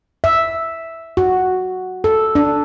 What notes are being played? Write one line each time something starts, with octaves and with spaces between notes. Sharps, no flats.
E5
F#4
A4
D4